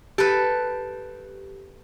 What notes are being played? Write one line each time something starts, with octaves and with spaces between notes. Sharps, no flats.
G4 A4 B4